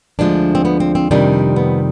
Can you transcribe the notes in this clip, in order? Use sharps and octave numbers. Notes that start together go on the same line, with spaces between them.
D2 D3 F3 G#3 D4
C4
B3
C4
C4
F2 C3 D#3 G3 D4
B3